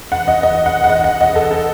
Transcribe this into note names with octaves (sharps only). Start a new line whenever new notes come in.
F#5
D#5
D#5
F#5
F#5
D#5
F#5
D#5
A4
A4